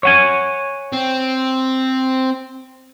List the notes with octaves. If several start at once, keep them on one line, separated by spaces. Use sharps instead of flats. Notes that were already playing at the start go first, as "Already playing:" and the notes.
C#5 F#5 G#5
C4